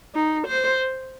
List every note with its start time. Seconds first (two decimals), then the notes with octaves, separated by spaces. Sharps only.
0.15 D#4
0.47 C5